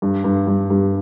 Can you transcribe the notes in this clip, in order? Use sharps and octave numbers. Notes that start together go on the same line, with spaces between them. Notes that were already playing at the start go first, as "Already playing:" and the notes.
G2
G2
G2
G2